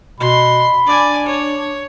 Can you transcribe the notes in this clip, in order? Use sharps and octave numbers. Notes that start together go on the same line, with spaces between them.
B2 B5 C6
D4 D5 G#5
C#5